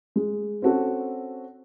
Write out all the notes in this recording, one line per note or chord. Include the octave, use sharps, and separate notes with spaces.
G#3
C4 C#4 F#4 A4